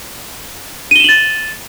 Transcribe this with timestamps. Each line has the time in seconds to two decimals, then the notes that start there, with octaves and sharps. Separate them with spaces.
0.91 D#7
0.96 G7
1.00 E7
1.04 F#7
1.09 A6